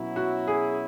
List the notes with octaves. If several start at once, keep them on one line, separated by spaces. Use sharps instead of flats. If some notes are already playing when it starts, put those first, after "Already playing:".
Already playing: B2 F#3 C#4 E4
F#4
G#4